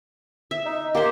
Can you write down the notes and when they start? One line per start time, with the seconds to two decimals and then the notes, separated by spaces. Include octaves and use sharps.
0.51 E5
0.66 D#4
0.95 A#3 G4 C5